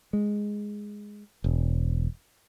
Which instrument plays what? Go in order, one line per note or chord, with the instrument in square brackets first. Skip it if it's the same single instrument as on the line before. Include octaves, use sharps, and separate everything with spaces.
[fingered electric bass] G#3
E1